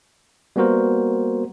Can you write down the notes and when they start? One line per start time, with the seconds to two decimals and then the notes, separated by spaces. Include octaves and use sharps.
0.56 G3 A#3 B3 F#4 A#4 C5